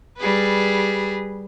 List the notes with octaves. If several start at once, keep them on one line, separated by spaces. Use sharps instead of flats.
G3 G#4 B4